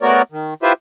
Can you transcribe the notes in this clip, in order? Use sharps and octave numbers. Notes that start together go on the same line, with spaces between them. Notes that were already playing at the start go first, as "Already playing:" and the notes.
A3 B3 F#4 A#4 C#5 D5
D#3
E4 F4 G4 B4 C5 E5